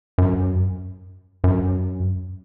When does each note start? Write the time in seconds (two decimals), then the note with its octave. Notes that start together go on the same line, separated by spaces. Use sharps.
0.18 F#2
1.44 F#2